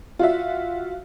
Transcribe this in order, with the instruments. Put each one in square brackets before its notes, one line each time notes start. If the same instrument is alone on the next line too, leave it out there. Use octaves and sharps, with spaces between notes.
[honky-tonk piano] F4 F#4 E5